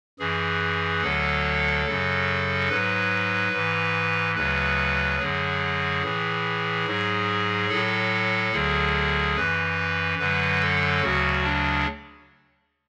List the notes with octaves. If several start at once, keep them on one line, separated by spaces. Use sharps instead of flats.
F#2 E3 G#4
D2 D3 F#3 A4
F#2 C#3 F#3
G#2 F#3 B4
G#2 E3
D2 C#3 F#3 B4
F#2 D3 F#3 G#4
A2 E3
G#2 F#3
A2 F#3 A4
D2 D3 F#3 G#4
F#2 E3 B4
F#2 D3 F#3 B4
A4
D2 C#3 F#3 F#4
D4